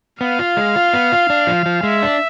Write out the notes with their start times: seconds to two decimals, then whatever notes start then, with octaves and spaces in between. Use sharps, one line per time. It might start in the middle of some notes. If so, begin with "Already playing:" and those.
0.21 B3 F5
0.39 F4
0.57 G#3
0.76 F4
0.94 B3
1.12 F4
1.30 D4
1.47 F3
1.66 F3
1.83 G#3 E5
2.03 D4